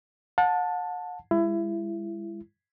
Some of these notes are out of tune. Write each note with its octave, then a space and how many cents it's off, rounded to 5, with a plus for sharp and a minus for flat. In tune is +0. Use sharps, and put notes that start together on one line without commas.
F#5 -40 A5 +0
G#3 -40 E4 +25